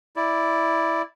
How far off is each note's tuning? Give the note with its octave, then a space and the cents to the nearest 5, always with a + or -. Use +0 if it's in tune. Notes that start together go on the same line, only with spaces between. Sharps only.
E4 +0 D5 +0